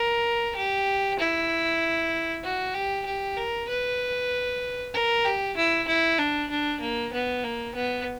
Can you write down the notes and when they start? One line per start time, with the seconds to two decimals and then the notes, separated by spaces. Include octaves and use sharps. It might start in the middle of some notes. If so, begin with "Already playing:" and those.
Already playing: A#4
0.56 G4
1.19 E4
2.44 F#4
2.74 G4
3.05 G4
3.37 A#4
3.69 B4
4.94 A#4
5.25 G4
5.57 E4
5.88 E4
6.19 D4
6.50 D4
6.81 A#3
7.13 B3
7.44 A#3
7.75 B3